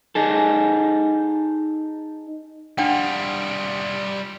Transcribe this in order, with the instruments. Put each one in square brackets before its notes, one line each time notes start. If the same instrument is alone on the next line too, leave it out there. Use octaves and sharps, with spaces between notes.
[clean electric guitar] D#4 G#4 A4
[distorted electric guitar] G3 F4 [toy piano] D4 F#5 G5